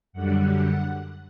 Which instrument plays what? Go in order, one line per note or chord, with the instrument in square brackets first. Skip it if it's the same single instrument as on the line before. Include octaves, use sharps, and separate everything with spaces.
[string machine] F#2 D3 G3 F#5
F#5